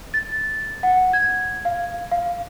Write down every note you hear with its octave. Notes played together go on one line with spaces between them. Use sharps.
A6
F#5
G#6
F5
F5